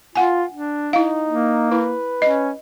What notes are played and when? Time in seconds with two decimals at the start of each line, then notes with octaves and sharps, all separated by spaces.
0.15 F4 F#5 G#5
0.52 D4
0.93 D#4 E4 F5
1.28 A#3
1.72 E4 B4
2.22 C#4 D#5